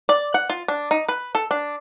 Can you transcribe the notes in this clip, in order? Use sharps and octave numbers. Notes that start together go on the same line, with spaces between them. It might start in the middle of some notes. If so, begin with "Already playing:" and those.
D5
F#5
F4
D4
D#4
B4
A4
D4